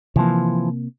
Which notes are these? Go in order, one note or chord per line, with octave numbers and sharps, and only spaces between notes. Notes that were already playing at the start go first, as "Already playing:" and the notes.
C3 E3 F3 A#3